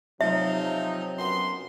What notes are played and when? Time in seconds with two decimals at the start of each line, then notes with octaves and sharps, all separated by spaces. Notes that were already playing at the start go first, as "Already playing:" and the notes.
0.21 C3 F3 F#3 D#4 E5
1.18 F#2 B3 C6